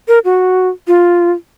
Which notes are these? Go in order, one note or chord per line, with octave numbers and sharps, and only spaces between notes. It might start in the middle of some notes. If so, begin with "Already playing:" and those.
A#4
F#4
F4